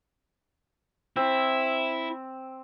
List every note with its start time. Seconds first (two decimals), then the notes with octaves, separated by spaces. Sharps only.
1.16 C4 E4